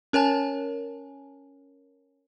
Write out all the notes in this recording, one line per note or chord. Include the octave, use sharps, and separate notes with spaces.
C#4 A#4 C#5 G#5 A5